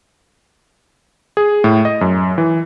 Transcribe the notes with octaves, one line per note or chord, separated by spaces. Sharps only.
G#4
A2
D#5
F#2
E3